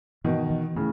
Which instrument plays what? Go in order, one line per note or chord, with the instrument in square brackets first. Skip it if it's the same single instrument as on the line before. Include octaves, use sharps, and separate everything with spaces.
[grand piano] B2 D#3 [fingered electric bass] E3
[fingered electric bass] E3
[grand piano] A2 C#3 [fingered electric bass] A3